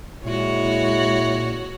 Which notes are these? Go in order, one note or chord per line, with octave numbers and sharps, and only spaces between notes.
A#2 G#3 E4 F#4 C#5